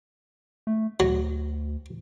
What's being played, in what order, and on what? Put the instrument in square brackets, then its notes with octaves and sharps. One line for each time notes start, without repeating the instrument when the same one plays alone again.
[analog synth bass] A3
[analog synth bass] D2 [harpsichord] F#3